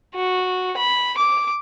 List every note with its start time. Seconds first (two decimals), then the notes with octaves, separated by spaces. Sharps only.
0.15 F#4
0.77 B5
1.17 D6